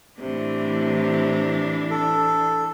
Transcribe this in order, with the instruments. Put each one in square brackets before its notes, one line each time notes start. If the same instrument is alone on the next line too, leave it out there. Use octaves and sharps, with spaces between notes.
[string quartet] A2 C3 [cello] E3 D4
[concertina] A4